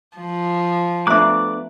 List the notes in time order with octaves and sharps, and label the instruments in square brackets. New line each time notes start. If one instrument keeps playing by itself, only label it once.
[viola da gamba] F3
[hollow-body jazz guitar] A3 B3 D4 [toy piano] E5 A#5 [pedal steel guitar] D6 F#6